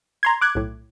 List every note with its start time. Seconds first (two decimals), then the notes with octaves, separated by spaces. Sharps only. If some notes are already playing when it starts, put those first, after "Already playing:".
0.23 A#5 C6 G#6
0.41 D6 F#6 G#6
0.55 B1 A2